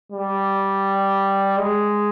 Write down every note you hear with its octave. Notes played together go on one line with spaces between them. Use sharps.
G3
G#3